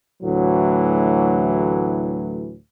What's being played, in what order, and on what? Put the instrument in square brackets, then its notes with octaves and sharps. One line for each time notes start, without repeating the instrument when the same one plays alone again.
[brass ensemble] D2 A2 E3 F#3